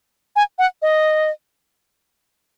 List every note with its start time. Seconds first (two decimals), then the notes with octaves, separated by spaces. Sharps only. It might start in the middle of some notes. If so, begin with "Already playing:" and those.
0.36 G#5
0.58 F#5
0.82 D#5